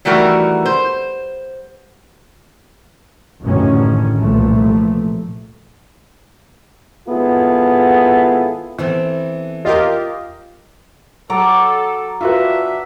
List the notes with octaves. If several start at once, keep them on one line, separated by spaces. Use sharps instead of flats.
D#3 E3 G3 A3 F#4 A#4
C5
A1 F#2 A2 D3 D#3 C#4
C2 A#2 E3 F3 A3
G#1 B3 E4 F4 G#4 A4
E3 B3 C4 A4
F4 G4 A#4 D#5
F#3 A4 A#5 D6
D4 F4 F#4 B4 E5